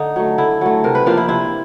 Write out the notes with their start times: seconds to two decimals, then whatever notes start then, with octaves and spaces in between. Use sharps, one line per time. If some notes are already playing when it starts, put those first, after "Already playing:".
Already playing: D3 D#4
0.16 F#3 A3
0.38 D3 E4
0.61 F#3 A3
0.84 C3 A#4
0.95 B4
1.06 F3 A#3 D4 F4
1.17 E4
1.29 C3 E4